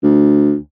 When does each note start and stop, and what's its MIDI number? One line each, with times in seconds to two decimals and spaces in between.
0.03 0.56 38